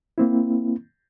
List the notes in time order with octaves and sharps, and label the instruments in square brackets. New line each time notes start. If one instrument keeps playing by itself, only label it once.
[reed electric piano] A#3 C4 E4